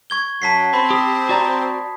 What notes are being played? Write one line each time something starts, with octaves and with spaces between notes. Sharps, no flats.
C#6 G#6 G7
F#2 F#3 A5 B6 C7
C4 B5
G4 D#6
F#4 D5 A#5